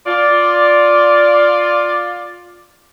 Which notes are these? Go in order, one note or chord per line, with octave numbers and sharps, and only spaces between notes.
F4 D5